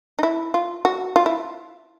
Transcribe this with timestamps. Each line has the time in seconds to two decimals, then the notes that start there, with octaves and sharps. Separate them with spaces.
0.19 D#4
0.23 E4
0.54 F4
0.85 F#4
1.16 F4
1.26 E4